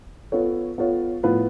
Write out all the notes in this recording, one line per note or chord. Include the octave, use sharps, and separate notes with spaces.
B3 F4 A4 C#5
B3 F4 A4 C#5
A2 F3 B3 F4 B4